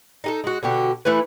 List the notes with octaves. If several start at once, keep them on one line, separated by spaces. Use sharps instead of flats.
D#4 G#4 A4
G#3 F#4
B2 D3 F#4 G4
E3 A3 E4 B4